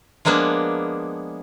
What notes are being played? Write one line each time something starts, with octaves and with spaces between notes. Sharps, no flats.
F3 G#3 A#3 B3 D4